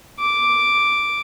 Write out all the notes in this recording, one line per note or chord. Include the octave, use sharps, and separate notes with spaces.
D6